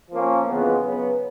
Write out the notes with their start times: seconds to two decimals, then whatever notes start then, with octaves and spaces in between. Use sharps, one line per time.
0.11 F3 A#3 C#4
0.46 F2 C#3 E3 G#3 B3
0.82 C#3 F#3 B3